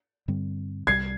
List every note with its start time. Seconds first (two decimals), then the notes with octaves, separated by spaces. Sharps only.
0.28 G2 D3 G3 C4
0.87 C2 C3 G3 G#6 C7